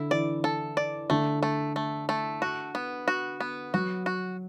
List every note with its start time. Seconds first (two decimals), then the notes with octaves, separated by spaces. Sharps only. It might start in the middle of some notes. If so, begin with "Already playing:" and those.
Already playing: D3 E4
0.11 E3 D5
0.44 A4
0.77 D5
1.10 D3 A3
1.43 A3
1.76 A3
2.09 A3
2.42 F#4
2.75 B3
3.08 F#4
3.40 B3
3.74 F#3 F#4
4.06 F#4